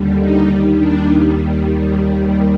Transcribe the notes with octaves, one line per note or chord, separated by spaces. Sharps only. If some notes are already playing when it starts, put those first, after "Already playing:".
Already playing: D#2 D3 G3
D#4
D#2 D#3 G3
D4
D#2 D#3 G3 D#4